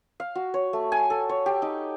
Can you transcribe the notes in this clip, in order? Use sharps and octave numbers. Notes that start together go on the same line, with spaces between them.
F5
F#4
C#5
A3
G#5
A4
C#5
G4
D#4